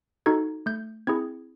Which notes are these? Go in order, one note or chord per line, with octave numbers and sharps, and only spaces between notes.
D#4 F#4 A4 G#6
A3 G6
C4 E4 G#4 G#6